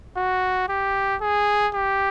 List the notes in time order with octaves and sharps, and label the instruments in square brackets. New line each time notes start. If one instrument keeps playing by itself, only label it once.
[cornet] F#4
G4
G#4
G4